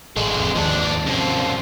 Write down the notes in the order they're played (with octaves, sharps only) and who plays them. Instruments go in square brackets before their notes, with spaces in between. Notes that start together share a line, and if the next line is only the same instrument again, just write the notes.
[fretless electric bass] A1 [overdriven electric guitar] D3 G#3
[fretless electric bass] F1 F2
[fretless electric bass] D#2 F3 [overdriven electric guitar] G#2 D4
[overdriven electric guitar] F#2 F3 [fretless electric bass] C3